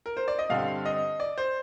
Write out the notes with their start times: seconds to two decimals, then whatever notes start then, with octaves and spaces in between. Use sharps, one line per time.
0.06 A#4
0.17 C5
0.28 D5
0.39 D#5
0.50 G2 D3 G3 C4 F5
0.85 D#5
1.20 D5
1.38 C5